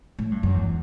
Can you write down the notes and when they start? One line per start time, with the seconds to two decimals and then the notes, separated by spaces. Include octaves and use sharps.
0.18 A2
0.31 G2
0.43 F#2
0.55 E2